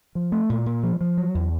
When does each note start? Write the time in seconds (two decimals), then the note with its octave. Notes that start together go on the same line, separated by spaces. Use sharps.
0.15 F3
0.32 A3
0.50 A#2
0.66 A#2
0.83 F3
1.01 F3
1.17 F#3
1.35 E2